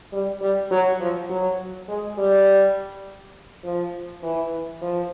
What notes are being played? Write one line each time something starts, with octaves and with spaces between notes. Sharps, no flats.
G3
G3
F#3
F3
F#3
G#3
G3
F3
E3
F3